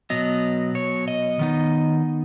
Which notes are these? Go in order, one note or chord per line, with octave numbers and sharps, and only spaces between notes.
B2 F#3 B3 D#5
C#5
D#5
D#3 B3 D#4